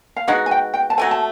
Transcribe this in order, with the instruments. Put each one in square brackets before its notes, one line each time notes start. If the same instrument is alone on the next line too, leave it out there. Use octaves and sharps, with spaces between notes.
[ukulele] F5
[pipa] G#3 B3 D#4 F#4 [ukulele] F#5
[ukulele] G#5
G5
G5
A5
[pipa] F#3 A3 C4 [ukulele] G#5
[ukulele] A5